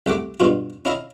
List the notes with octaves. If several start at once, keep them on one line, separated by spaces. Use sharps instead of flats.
C2 A3 F#5 D6
G2 B2 F4 F#4
C#4 E4 D#5 F5 A#5